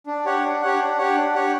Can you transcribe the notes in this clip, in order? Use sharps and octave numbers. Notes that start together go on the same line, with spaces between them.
D4
G4 C#5 F#5
D4
G4 C#5 F#5
D4
G4 C#5 F#5
D4
G4 C#5 F#5